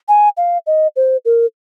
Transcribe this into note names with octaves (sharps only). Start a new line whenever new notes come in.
G#5
F5
D#5
C5
A#4